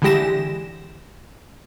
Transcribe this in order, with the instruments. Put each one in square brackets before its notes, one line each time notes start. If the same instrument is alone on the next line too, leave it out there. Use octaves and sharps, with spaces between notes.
[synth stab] D3 E3 G#3 G4 A#6 E7